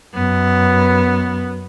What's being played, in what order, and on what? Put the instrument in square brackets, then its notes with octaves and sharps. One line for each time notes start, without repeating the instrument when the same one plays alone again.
[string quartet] F#2 [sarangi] B3